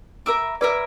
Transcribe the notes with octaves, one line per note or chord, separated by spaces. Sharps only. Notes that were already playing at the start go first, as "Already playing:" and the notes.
A#4 E5 B5 D6
A#4 B4 D5 E5 B5 D6